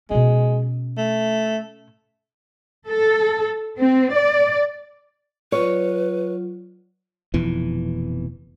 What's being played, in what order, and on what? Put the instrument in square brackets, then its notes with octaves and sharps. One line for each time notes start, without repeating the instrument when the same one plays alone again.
[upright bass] B2 C#4 [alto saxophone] G#3
[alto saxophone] A3
[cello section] A4
C4
D5
[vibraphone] F#3 F4 [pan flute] B4 [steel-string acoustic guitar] C#5
[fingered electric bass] F1 F2 B2 E3